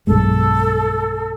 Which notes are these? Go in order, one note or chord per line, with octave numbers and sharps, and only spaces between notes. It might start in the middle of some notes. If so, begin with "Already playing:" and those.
B1 G2 G#3 A4